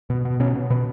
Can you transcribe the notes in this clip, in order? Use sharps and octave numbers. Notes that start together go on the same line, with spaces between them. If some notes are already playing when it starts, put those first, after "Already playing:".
B2
B2
B2 C#4
B2
B2 B3